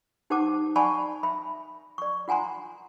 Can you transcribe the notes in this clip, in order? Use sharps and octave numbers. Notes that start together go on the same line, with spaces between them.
D#4 G4 C5 F#5 A5 D6
D5 F#5 G#5 A5 B5 C#6
E5 B5
D5 C#6
F4 F#5 G#5 A#5 C6